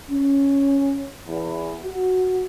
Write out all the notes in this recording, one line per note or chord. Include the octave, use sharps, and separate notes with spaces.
C#4
E2
F#4